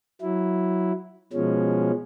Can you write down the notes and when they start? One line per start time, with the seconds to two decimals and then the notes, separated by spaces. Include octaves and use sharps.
0.21 F#3 E4
1.33 B2 F3 G#3 C#4